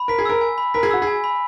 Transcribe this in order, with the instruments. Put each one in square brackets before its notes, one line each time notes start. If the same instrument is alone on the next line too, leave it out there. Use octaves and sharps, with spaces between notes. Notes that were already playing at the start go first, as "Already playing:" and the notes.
Already playing: [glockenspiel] B5
[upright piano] A#4 [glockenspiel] B6
[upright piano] G#4
[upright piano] A#4 [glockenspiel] E6
[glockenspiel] G#5
B5
[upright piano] A#4 [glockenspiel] B6
[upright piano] G#4
[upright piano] F#4 [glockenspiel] E6
[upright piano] G#4
[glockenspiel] G#5
B5